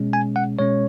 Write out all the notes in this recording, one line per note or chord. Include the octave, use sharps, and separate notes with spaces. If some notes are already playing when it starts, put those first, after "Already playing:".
Already playing: B2 G#3 C#4
G#5
F#5
B2 G#3 C#4 C#5